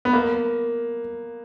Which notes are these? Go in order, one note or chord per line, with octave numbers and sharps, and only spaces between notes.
B3
A#3